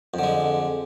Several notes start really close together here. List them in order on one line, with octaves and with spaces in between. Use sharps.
F2 D3 G#3